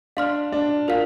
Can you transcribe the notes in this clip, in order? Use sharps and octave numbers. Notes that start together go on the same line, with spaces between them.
D4 F5 C6 F6
D4
F4 A#4 F5